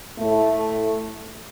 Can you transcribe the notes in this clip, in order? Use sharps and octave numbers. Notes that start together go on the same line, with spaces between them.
A2 A3